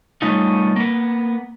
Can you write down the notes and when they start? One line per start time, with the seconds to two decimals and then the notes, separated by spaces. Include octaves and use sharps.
0.22 G3 A3 B3 C#4 D#4 F4
0.76 A#3 B3